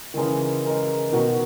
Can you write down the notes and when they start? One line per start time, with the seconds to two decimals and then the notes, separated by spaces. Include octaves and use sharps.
0.14 D#3
0.17 C#3 E3 G#3 D#4 A#4
0.66 G#3 D#4 A#4
1.12 B2 D#3 D#4 F#4 B4